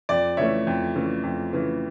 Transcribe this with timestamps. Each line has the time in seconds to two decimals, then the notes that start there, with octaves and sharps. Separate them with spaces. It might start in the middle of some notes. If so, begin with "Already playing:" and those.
0.09 F2 D5
0.37 C#3 E3 A3 C#5 E5
0.67 F2
0.95 C#3 E3 A3
1.23 F2
1.53 C#3 E3 A3